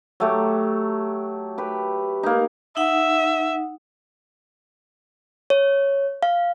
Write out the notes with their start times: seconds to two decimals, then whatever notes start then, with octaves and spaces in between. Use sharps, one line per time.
0.20 F#3 A3 G4
1.58 G4 B4
2.23 A#3 D#4
2.77 D#4 E5 F#5
5.50 C#5
6.23 F5